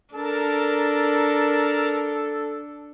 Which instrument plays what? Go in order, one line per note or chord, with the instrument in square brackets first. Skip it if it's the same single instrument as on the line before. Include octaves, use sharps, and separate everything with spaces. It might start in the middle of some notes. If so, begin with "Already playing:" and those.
[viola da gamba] D4 [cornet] A4 [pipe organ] A#4 A5